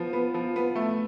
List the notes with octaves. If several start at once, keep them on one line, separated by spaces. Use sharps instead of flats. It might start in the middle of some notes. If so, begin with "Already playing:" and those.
Already playing: F3 B3
B3
F3
B3
A3